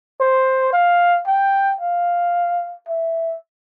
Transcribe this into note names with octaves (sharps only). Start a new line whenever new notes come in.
C5
F5
G5
F5
E5